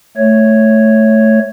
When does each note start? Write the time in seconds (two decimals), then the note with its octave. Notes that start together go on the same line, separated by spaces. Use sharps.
0.17 A3 C#5